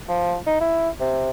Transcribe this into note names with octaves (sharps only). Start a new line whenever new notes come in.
F3
D#4
E4
C3